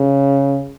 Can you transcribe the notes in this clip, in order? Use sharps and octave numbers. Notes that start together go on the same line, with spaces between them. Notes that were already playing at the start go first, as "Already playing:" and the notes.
Already playing: C#3